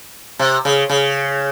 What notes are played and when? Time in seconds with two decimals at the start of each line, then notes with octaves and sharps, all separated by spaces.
0.39 C3
0.65 C#3
0.89 C#3